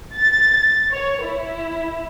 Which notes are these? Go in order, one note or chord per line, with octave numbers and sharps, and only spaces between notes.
A6
C#5
E4